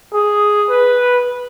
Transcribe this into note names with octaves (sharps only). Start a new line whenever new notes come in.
G#4
B4